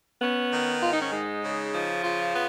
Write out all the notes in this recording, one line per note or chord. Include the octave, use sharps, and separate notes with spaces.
B3 C#4
D#3
G#2 F4
D#4
C#4
G#3 D#4
C#3
F3
C#3 F4
B3